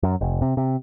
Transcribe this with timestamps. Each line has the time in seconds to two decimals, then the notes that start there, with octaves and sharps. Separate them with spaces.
0.03 F#2
0.21 F1
0.42 C3
0.57 C3